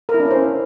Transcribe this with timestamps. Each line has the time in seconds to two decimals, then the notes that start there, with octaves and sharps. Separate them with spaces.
0.09 A#4
0.14 E4
0.20 D4
0.25 C#4
0.31 C5